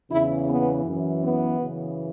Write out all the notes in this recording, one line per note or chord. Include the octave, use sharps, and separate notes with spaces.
E2 C#3 E3 E4
B3
F#2 E3
B3
F#2 C#3 E3